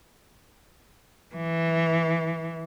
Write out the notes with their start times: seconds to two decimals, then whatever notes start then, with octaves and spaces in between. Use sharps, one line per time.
1.36 E3